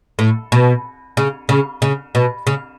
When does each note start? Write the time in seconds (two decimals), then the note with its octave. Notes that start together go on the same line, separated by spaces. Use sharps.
0.19 A2
0.52 B2
1.17 C#3
1.49 C#3
1.82 C#3
2.15 B2
2.47 C#3